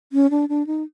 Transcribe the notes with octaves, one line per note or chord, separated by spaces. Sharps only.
C#4
D4
D4
D#4